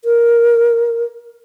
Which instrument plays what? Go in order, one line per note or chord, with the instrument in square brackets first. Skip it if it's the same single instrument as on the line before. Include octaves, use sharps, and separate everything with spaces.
[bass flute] A#4